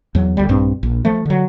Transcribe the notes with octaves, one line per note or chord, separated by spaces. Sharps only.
E2 F#3
D2 G3
A#1 G2 C4
A#1
F3 A3
D3 F#3